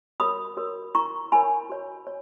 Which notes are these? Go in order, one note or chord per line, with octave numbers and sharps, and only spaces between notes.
F#4 A#4 C#5 B5 D#6
F#4 A#4 C#5
E4 A#4 C#5 A#5 C#6
E4 A#4 C#5 G#5 B5
F#4 C#5
C#5